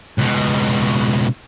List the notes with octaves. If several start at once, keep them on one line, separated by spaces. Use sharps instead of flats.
C#2 B2